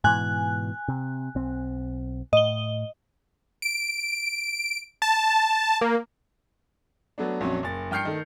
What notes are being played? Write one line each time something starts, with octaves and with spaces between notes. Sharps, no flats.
G#2 B2 E3 G#5 F#6
C3
B1 C4
A2 D#5 G7
D7
A5
A#3
F#3 A3 B3 D4
A#1 F2 F#3 C#4
F#1 A6
G2 G5 F6 G6 C7 C#7
D#3 A3